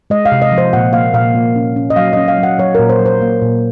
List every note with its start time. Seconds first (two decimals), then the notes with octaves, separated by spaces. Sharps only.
0.10 G#3 D#5
0.25 F5
0.32 C3
0.42 D#5
0.52 F3
0.58 C5
0.73 A#2 F#5
0.93 A#3 F5
1.14 A#2 F5
1.35 A#3
1.56 C#4
1.76 C#4
1.90 D#5
1.96 F#3 F5
2.13 C#4 D#5
2.28 F5
2.38 F#3 F#5
2.59 F#3 C#5
2.75 A#2 A#4
2.89 C5
3.00 F#3
3.06 C5
3.21 A#3
3.42 A#2